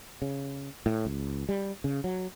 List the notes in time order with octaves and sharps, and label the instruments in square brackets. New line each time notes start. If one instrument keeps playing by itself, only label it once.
[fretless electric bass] C#3
A2
C#2
G3
C#3
F#3